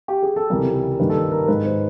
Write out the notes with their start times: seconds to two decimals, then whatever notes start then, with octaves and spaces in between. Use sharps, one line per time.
0.08 G4
0.23 G#4
0.36 A4
0.50 C#2 C3 E3 G3 A#4
0.75 A#4
0.93 A#4
0.99 G2 D#3 G3 A#3 B4
1.10 A4
1.16 A#4
1.32 A#4
1.43 A#4
1.48 G#2 D#3 G#3 B4
1.65 C5